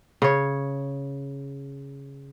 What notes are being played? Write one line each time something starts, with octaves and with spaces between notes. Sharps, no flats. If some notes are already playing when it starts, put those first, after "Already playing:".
C#3 C#5